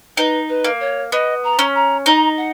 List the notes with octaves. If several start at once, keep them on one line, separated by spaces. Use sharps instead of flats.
D#4 B4
B4
A#3
C#5
B3 D#5
A#5
C#4
A#5
D#4 A#5
F#5